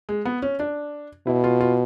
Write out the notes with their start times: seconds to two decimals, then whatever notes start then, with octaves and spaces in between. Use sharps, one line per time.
0.09 G#3
0.25 B3
0.42 C#4
0.59 D4
1.27 B2 E4
1.44 F4
1.61 F4